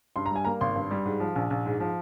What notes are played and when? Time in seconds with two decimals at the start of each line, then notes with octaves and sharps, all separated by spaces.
0.16 G2 C6
0.26 A#5
0.31 G3 G#5
0.45 A#3 A#5
0.61 G#1 C6
0.76 G2
0.91 G3
1.05 G#2
1.20 F3
1.36 A#1
1.50 A#1
1.66 G#2
1.80 F3